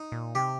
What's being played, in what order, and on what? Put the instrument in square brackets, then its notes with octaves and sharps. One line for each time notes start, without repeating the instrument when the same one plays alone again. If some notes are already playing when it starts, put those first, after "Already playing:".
Already playing: [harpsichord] D#4
[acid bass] A#2
[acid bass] C3 [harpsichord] G4